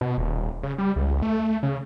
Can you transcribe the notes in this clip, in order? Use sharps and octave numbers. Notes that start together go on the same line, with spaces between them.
B2
D#1
C#3
G3
C#2
A3
C#3